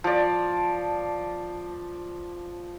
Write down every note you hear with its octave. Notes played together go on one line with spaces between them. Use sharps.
F3 D5